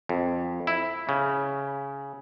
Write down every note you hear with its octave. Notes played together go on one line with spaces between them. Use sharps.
F2
E4
C#3